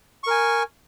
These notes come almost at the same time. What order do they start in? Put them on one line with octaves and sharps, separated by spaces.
C#6 A#4 G#5